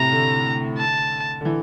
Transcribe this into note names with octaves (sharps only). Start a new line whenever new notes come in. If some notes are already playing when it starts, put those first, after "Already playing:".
Already playing: A2 C3 A#5
D3
A5
D3
E3